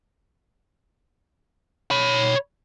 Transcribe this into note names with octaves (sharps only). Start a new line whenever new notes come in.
C#5 B5